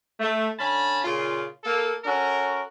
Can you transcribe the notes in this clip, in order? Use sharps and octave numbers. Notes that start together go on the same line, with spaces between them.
A3
D3 C#4 A5 B5
A#2 C#3 F4
A#3 A4
C#4 F#4 A4 A#4